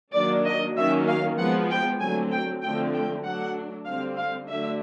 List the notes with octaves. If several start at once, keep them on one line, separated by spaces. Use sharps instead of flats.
D#3 F#3 A#3 D4 D5
D#5
D#3 F#3 A#3 C#4 E5
F5
F3 G#3 B3 F#5
G5
D3 F#3 A3 C4 G#5
G5
D3 F3 A3 C4 G5
G5
F#3 A3 D4 F#5
D3 G3 C4 F5
F5
D3 F#3 A3 D4 E5